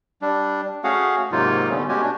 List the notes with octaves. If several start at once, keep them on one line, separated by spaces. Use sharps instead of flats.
G3 D4
A3 C#4 F#4 G#4 F5 F#5
G#2 C3 F#3 A#3 D#4 F4
B2 D3 G3 A3 B3 C#4
B2 G#3 C#4 F#4 G4 G#5
A3 D4